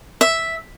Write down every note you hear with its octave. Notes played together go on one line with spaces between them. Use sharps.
E5